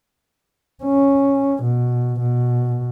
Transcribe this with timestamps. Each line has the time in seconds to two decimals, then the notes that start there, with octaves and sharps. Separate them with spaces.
0.84 C#4
1.64 B2
2.20 B2